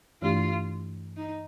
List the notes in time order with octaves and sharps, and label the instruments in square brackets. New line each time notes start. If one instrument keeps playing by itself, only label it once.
[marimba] G2 E3 A3 D4 G4 [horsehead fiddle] F4
[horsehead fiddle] D#4